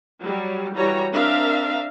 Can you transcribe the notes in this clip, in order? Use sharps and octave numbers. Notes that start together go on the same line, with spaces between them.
F#3 G3
E3 G3 F#4 C#5 A#5
C4 D4 A#4 E5 F5